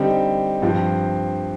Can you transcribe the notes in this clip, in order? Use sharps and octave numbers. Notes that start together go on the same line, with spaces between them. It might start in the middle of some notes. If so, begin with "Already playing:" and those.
Already playing: D3 G3 C4 D#4 G4
G2 F3 C4 G4